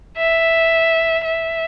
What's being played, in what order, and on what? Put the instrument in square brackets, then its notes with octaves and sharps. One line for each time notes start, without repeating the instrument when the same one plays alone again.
[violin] E5
E5